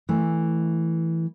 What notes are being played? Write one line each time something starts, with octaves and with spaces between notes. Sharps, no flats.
E3 A3